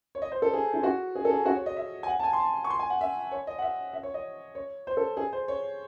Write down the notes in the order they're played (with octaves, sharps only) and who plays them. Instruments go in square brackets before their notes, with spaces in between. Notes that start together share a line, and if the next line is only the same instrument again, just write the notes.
[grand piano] C#5
D#5
C5
A4
G#4
E4
F#4
G#4
A4
G#4
F#4
C#5
D#5
E5
G#5
F#5
A5
G#5
C6
A5
C#6
C6
G#5
F#5
E5
C#5
D#5
F#5
E5
E5
C#5
D#5
C#5
C5
A4
G#4
C5
C#5